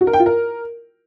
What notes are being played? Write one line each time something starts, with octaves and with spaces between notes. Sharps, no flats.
F#4
A#4
G5
F4
A#4